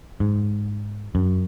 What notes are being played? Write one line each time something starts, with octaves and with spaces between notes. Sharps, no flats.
G#2
F#2